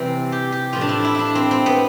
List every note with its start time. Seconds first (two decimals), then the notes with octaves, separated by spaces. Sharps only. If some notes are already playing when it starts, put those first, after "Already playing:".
Already playing: C3 E3 G3 C4
0.32 G4
0.52 G4
0.73 A2 F3 F4
0.81 D4
0.89 E4
1.04 E4
1.15 D4 E4
1.35 C4
1.51 C4
1.66 B3